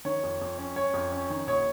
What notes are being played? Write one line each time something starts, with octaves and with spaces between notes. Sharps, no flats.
D#3 C#5
F2
F2
C#4
C#4 C#5
F2
C#4
D#3
A#1 C#5